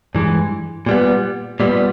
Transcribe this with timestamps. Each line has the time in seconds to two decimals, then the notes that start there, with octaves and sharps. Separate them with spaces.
0.15 G2 E3 G#3
0.86 A#2 G3 B3
1.60 A#2 G3 B3